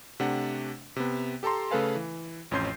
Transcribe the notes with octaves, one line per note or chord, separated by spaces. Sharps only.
C3 A3 D4 F#5
C3 B3
G4 A4 A5 A#5 C6
C#3 A3 A4 B4 F5 G#5
E3
A1 F2 C#4 C6 G6 C7